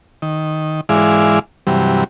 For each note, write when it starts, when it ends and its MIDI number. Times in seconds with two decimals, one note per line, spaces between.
0.22 0.81 51
0.89 1.39 44
0.89 1.39 52
0.89 1.39 56
0.89 1.39 64
0.89 1.39 74
0.89 1.39 77
1.67 2.04 43
1.67 2.04 48
1.67 2.04 52
1.67 2.04 54
1.67 2.04 55